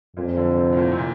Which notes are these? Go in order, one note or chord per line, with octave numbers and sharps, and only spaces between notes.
F2 A#2
D3
C3
A2
A#2
C3
A#2